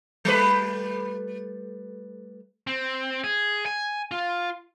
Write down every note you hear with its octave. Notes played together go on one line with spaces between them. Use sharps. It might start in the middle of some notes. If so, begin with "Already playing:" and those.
G3 A3 B4
C4
G#4
G#5
F4